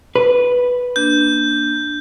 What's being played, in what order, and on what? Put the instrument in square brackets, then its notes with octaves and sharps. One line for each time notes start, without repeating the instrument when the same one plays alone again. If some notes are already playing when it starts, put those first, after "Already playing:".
[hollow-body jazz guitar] B4
[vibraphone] A#3 D4 [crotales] G6